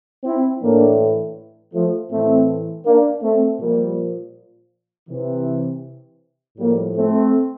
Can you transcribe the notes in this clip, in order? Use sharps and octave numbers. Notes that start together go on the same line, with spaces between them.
C4 E4
A2 E3 A#3 D4
F3 A3
A2 E3 A3 C4
A#3 D4
A3 C4
A#2 F3 G3 A#3
C3 E3
A2 F3 G3 A#3
A3 C4